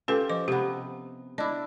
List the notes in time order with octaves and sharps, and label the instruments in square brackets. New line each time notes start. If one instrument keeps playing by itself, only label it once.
[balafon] C#4 A4 B4 [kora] F4 G4
[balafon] F3 D#5 D6
[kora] C3 B3 [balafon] G4
[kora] D4 E4 [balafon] D#5